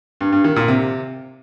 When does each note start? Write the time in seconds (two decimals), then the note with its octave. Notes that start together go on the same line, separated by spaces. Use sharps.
0.21 G2
0.32 G2
0.44 D#3
0.56 A#2
0.68 C3